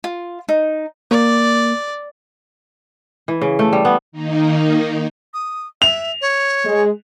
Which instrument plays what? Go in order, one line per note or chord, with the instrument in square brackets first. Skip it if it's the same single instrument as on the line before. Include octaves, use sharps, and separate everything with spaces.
[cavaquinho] F4
D#4
[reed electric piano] A#3 [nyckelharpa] D5
[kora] E3
C#3
A3
G3
B3
[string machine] D#3 A#3 D#4
[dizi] D#6
[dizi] E5 [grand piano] F7
[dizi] C#5
[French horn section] G#3